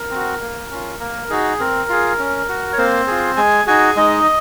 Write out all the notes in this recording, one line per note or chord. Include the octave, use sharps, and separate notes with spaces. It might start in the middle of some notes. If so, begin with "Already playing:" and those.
Already playing: A#4
C4 F#4
A#3
C#4 F4
A#3 A#4
D#4 F#4 G#4
C4 A#4
F4 G#4
C#4
F#4
C#5
A#3 C4 C5
F4 G#4
G#3 G#4 G#5
D#4 F#4 G#4 G#5
G#3 D#4 D#5